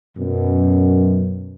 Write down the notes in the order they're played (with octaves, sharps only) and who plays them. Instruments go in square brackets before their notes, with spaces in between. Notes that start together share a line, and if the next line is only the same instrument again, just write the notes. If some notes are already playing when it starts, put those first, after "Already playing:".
[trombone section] F#2 B2